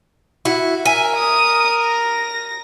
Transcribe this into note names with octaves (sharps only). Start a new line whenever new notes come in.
E4 F#4
A#4 E5 G#5
D#6
A#6